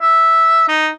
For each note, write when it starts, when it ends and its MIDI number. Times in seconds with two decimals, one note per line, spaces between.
0.02 0.66 76
0.68 0.89 63